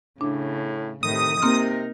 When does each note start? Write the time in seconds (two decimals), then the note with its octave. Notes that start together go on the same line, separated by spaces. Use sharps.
0.21 A2 C#3 D4
1.03 A2 C3 D#3 D#6
1.42 C3 A#3 C4 D#4 A#4 F6